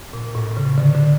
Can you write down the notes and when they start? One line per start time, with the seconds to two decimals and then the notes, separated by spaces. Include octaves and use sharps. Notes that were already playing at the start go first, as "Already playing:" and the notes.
0.13 A#2
0.35 A2
0.57 C#3
0.78 D3
0.95 D3